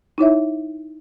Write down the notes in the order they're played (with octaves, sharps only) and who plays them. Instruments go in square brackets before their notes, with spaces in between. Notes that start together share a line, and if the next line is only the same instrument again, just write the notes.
[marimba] D#4 E4 C#5 E5